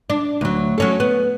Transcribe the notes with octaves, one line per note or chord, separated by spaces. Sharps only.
D4
D2 F#3
F#3 C#4 A4
B3